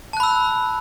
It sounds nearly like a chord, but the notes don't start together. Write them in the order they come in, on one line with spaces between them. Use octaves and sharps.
A5 F#6 B5 E6